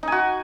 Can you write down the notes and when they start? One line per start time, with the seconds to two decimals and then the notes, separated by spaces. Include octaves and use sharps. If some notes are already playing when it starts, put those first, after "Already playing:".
0.03 D#4
0.07 G#5
0.12 F#4